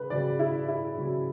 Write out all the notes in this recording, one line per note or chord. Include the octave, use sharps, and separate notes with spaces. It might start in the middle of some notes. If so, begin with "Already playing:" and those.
Already playing: C#3 B4
C#3 F#3 C#4 D5
E4
E4
C#3 F#3 C#4